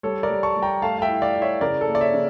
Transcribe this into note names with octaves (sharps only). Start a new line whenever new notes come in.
G3 A4 C#5
A#4 D5
G3
A5 C#6
G3
G5 A#5
A3 F5 A5
F5
E5 G5
E4
D5 F5
E4
C#5 E5
C#3 A#4 D5
A4
A#3
D5
C#5 E5
C#3